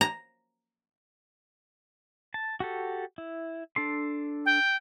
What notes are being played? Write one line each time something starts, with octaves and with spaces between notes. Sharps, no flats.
A#5
A5
F#4 G4 A4
E4
D4 A4 C6
G5